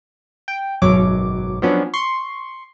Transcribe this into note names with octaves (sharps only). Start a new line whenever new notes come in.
G5
G#1 F#2 B2 F#3 C#5 D6
F3 F#3 B3 C#4 D4
C6 C#6